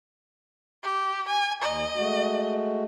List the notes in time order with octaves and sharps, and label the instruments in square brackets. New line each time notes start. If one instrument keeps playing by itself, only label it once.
[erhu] G4
G#5
[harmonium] D#2 A#5 [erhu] D#5
[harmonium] G#3 A3 F#4